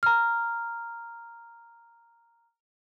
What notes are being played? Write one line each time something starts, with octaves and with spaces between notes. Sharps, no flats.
A#5 F6